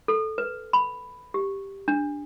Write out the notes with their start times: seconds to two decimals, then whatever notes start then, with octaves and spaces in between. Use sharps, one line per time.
0.08 A4
0.38 B4
0.73 B5
1.34 G4
1.88 D4